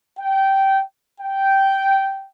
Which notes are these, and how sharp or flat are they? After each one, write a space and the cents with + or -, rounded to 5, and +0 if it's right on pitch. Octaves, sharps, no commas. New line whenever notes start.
G5 -15
G5 -10